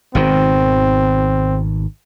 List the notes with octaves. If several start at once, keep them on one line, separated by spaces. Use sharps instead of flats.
G#1 B2 D#3 C4